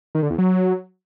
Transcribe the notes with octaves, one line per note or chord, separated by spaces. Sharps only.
D#3
D3
E2
F#3